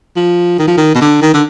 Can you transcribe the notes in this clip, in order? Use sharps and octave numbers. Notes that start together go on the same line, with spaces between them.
F3
D#3
F3
D#3
B2
D3
D#3
D3